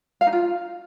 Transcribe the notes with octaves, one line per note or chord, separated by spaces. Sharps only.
F5
D#4
F4